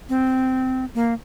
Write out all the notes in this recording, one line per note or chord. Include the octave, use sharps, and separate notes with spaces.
C4
A#3